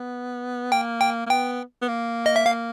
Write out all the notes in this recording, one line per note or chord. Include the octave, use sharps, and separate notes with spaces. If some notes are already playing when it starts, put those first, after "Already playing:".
Already playing: B3
A#3 G5
G5
A#3
B3 G5
B3
A#3
D#5
E5
A#3 F5